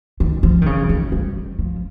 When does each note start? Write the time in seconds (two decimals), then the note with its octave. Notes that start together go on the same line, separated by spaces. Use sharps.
0.20 D#3
0.43 F3
0.62 D#3
0.66 C#3
0.89 D#3
1.12 G3
1.59 F3